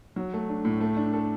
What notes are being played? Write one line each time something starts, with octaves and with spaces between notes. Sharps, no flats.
F#3
A3
D4
A2
A3
D4
A4